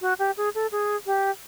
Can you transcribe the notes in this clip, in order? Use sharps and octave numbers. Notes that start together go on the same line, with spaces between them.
F#4
G4
G#4
A4
G#4
G4